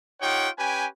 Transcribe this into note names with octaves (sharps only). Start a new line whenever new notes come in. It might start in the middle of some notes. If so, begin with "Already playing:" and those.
D#4 F4 G4 C#5 F#5 G5
C#4 G4 B4 G5 G#5